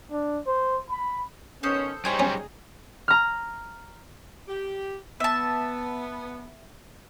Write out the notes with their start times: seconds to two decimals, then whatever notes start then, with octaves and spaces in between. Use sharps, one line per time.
0.12 D4
0.47 C5
0.90 B5
1.63 D#3 B3 C#4 A4 C5 D#6
2.05 G3 D#4 G#4 C5 C#5 A#5
2.19 F#3 C#4
3.08 A#5 F6
4.48 G4
5.20 B3 E5 A5